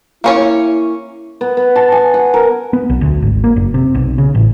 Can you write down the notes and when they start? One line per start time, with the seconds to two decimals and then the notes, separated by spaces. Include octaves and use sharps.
0.24 A#3 C#4 E4 C#5
1.41 B3
1.57 B3
1.76 A5
1.92 G#5
2.14 F#5
2.34 A#4
2.73 B3
2.90 B1
3.01 D2
3.22 G#1
3.44 A#3
3.56 F#1
3.74 C3
3.95 B1
4.18 C#3
4.35 A1